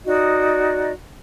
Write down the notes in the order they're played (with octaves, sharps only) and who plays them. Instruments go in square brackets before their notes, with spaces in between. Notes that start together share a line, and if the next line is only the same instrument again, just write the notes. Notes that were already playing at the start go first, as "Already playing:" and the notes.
[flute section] D#4 F#4 D5 D#5